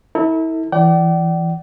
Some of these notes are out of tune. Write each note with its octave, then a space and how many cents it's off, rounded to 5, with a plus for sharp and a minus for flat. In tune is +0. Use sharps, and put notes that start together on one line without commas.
E4 -35 A4 +40
E3 +15 D5 +0 G5 -45